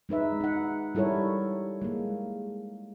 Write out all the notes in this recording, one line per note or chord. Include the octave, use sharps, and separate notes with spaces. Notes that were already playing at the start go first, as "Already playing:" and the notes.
G#3 D#4 B4 E5
D#4 F#5
G3 E4 A4 A#4 C#5
G#3 A#3